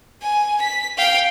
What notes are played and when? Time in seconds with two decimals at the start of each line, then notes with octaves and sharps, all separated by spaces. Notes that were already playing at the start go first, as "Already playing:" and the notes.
0.22 G#5
0.61 B6
0.97 F5 G5